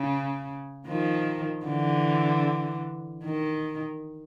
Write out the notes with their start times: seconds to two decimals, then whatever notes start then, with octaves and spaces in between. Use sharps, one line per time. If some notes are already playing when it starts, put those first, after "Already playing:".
Already playing: C#3
0.87 D#3 F3
1.65 D3 E3
3.24 D#3